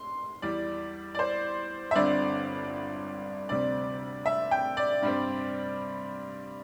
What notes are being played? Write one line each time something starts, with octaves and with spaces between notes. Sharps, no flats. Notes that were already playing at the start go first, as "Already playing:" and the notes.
Already playing: C6
E2 E3 G3 D5
D5
C5
E5
G1 G2 D3 C4 D5
D2 C3 G3 C4 D5
E5
G5
D5
G2 G3 C4